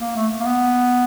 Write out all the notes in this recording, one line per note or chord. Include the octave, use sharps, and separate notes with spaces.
A#3
A3
A#3
B3